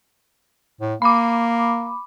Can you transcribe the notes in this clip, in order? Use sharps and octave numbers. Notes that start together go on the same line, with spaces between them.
A2
A#3 B5 D6